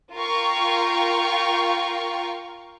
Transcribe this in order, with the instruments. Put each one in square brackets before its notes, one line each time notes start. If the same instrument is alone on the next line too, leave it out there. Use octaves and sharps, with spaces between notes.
[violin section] F4 A#4 F5 G5 C#6